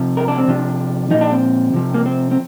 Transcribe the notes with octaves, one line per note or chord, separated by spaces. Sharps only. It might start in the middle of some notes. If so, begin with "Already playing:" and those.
Already playing: C3 F3
A#4
D4
C4
C3 F3 D4
A#2 F3 D#4
D4
C4
C3 F3
A#3
C4
C4